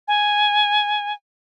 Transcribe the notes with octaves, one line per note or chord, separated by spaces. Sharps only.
G#5